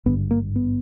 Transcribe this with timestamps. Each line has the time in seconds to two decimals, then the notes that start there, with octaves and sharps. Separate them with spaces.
0.06 G#1 G2 D3 B3
0.31 A#3
0.56 B3